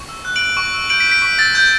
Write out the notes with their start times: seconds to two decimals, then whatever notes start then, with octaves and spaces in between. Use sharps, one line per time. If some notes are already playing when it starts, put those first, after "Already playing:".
Already playing: C#6
0.09 E6
0.25 F#6
0.36 D7 F#7
0.41 F#6
0.57 C#6
0.74 E6
0.89 G6 D7 F#7
1.00 B6 D7
1.06 G6
1.11 B6 D7
1.22 C#6 B6
1.39 E6 A6
1.55 G6